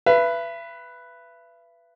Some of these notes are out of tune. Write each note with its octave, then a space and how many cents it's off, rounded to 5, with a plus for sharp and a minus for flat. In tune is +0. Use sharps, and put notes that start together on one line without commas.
B4 +0 E5 +40